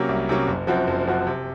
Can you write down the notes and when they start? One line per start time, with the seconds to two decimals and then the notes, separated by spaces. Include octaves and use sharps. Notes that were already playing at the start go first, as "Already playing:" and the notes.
Already playing: C3 F#3 A#3 C#4
0.09 C2
0.29 C3 F#3 A#3 C#4
0.47 F#1
0.67 F#2 F3 C4 F#4
0.87 F#1
1.07 F#2 F3 C4 F#4
1.27 C3